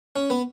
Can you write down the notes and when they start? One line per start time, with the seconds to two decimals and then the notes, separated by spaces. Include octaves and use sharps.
0.16 C#4
0.30 B3